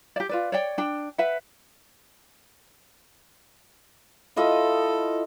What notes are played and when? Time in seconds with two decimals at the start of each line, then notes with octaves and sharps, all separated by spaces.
0.16 G4 D5
0.29 F4 B4 D5
0.52 C#5 D5 G5
0.78 D4 G5
1.18 B4 E5 F#5
4.36 E4 F4 A4 D#5